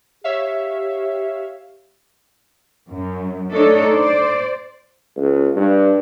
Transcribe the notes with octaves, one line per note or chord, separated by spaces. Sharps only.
G4 C#5 E5 F5
F#2
A3 D4 D#4 A4 C#5
C5 D5
C#2
G2